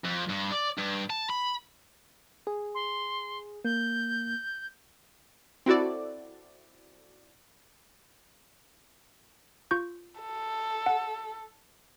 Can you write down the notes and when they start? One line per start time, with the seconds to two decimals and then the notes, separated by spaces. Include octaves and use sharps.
0.04 F2
0.29 G2
0.51 D5
0.78 G2
1.10 A5
1.30 B5
2.47 G#4
2.75 C6
3.65 A#3 G6
5.66 C4 E4 F#4 A4 D5
9.71 F4 C#6 G6
10.21 A4
10.86 F#5